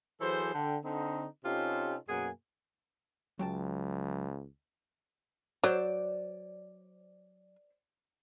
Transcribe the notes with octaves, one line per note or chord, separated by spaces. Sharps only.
E3 F#3 G#4 A4 C5
D3 G5
D3 C4 D#4
C3 C#4 D#4 F4 G4 A4
F#2 B2 A#3 G#4 F#5 G#5
C#2 F#3 G5 A5
F#3 C5 D5